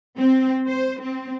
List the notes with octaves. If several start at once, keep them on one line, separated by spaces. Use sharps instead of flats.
C4
C5
C4